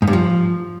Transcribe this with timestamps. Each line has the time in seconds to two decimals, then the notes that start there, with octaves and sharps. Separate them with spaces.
0.02 G#2
0.07 G2
0.13 F3